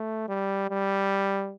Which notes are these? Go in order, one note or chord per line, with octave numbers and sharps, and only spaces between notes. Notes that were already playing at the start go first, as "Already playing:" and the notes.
Already playing: A3
G3
G3